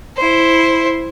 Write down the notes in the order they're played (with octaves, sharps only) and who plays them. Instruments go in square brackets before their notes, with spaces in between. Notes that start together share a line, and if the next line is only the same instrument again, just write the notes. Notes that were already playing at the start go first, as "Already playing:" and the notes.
[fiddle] E4 C5